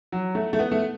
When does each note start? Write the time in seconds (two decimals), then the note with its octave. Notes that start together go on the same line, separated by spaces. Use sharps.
0.12 F#3
0.35 A3
0.53 A3
0.59 B3
0.72 A3